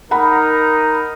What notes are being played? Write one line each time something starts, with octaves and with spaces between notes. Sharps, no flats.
D#4 A#4 F#5 A#5 B5